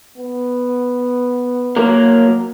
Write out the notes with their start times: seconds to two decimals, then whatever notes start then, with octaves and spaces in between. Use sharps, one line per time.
0.18 B3
1.76 F#3 A#3 A#4